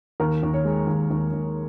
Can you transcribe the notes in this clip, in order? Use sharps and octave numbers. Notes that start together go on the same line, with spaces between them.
D#2 A#4
D#2
C#5
G#3
D#2
D#2
D#2